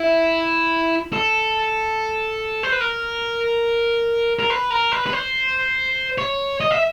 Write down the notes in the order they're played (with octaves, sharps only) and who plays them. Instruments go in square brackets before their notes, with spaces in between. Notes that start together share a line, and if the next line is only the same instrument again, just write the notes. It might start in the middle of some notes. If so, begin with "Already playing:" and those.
Already playing: [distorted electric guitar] E4
A4
C5
B4
A#4
A#4
B4
A#4
B4
B4
C5
C#5
D#5
E5